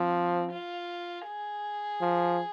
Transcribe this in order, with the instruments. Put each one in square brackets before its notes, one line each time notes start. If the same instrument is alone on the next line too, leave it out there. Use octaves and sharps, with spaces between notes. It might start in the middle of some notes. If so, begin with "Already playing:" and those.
Already playing: [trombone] F3 [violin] C4
[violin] F4
G#4
[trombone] F3